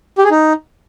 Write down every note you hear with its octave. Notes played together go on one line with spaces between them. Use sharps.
G4
G#4
D#4